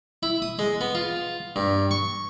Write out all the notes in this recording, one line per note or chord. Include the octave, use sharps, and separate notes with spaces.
E4
D#6
G#3
B3
F4
G2
C#6